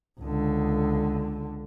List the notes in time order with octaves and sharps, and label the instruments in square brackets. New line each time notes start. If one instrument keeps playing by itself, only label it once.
[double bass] C#2 D3